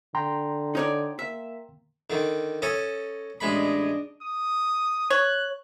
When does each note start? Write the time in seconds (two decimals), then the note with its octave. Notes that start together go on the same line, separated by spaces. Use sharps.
0.15 D3 G5 A#5 C6
0.75 D#4 C#5 D5
1.19 A#3 E5
2.10 D3 D#3
2.62 C#4 A4 D#5
3.41 A1 G#3 D4 D#5 B5
4.23 D#6
5.10 C#5 F#6